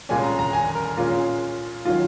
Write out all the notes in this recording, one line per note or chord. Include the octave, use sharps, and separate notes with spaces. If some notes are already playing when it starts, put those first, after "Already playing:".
C2 A#2 G#3 C#4 G#5
A#5
A#5
G#5
A#4
A#2 G#3 C#4 F4
D#3 F#3 C#4 F4